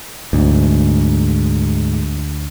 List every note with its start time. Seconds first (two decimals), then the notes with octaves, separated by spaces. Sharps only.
0.33 D2 G#2